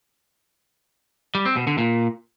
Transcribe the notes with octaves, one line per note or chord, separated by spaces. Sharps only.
G3
C4
B2
D3
A#2